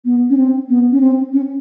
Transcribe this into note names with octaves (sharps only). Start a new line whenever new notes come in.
B3
C#4
C4
B3
C#4
C4
C#4